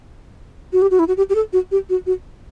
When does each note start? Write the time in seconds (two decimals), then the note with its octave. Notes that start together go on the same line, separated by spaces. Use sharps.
0.73 F#4
0.82 G4
0.91 F#4
0.99 E4
1.08 F#4
1.17 G4
1.29 G4
1.35 A4
1.53 F#4
1.71 G4
1.89 F#4
2.06 F#4